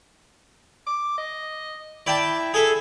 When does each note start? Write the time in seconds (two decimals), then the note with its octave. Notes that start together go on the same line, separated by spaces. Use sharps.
0.87 D6
1.18 D#5
2.07 E4 D5 G5 A5
2.54 G#4 A4 E5 G#5